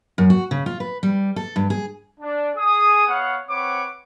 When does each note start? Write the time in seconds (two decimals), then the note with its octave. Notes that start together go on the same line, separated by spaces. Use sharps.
0.18 F#2
0.30 F#4
0.51 C#3
0.66 F4
0.80 B4
1.03 G3
1.36 A4
1.56 G2
1.70 G#4
2.21 D4
2.55 G#4 D#6
3.07 B3 C#5 F5 F#5
3.48 C4 B4 C#5 F#5 C#6 D6